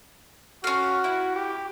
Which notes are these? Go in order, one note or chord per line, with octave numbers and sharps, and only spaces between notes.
C#4 F#4 F5
E4
G4